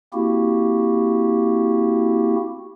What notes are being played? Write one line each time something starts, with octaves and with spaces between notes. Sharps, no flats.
A#3 C4 E4 F#4 G4